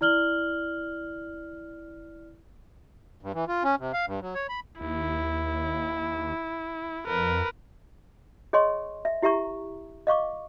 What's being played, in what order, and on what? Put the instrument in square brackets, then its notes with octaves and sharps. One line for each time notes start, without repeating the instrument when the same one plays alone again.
[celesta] E4 D5 F6 F#7 G7
[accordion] G2
E3
F4
C#4
C3
F5
G2
F#3
C#5
B5
[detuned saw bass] D#2 [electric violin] E4
[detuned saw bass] F2 [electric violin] A#4 B4
[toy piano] G#4 C#5 D#5 G#5 C6 C#6
E5
E4 G4 E5 A#5 C#6
D#5 F5 C#6 D6